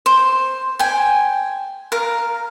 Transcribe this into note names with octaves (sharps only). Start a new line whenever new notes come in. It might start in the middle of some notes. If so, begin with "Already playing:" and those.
C5
G5 G#5
A#4 F5